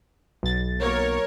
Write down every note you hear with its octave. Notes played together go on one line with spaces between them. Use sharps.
B1 A6
F#3 A#3 A#4 C#5